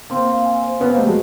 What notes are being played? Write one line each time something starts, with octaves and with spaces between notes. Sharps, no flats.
A#3 C4 C6
F5
G#5
C5
B3 C#4 B4
A#3 C4
G3 A3 D#5
F#3 G#3